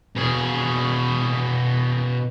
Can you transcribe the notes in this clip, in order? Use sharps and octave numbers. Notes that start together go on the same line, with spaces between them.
B2 G#4